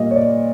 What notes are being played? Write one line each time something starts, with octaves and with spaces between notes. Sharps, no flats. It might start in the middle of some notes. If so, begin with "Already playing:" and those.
Already playing: A#2 G3 A#3 D#5
C#5
D5